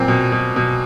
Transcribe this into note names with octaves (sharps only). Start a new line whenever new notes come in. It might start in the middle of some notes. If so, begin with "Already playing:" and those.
Already playing: A#2 C4
B2
B2
B2